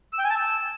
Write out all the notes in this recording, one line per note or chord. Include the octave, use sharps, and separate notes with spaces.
E6
G5
G#5
A5
E6